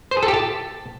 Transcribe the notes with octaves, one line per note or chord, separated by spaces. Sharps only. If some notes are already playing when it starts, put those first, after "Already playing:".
C5
G#4
A4
G4
A5